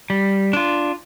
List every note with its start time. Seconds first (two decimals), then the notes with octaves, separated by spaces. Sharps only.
0.10 G3
0.53 D4 F4